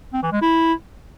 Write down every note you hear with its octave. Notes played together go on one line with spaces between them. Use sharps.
C4
E3
G#3
E4